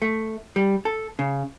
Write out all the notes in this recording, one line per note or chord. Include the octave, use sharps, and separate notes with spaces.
A3
G3
A4
C#3